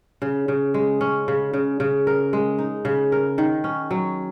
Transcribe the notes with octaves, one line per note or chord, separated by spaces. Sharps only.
C#3
C#3
G#3
C#4
C#3
C#3
C#3
A#4
G#3
D#4
C#3
A#4
D#3
C#4
F#3